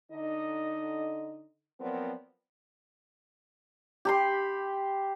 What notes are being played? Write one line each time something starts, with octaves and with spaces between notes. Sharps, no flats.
D3 D#4 D#5
F3 F#3 B3 C4 A#4 D5
G4 B5 C6